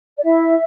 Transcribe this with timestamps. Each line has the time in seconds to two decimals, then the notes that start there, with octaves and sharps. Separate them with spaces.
0.18 D5
0.23 E4 E5